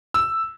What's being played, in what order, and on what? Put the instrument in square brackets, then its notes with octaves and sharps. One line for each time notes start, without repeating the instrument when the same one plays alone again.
[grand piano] E6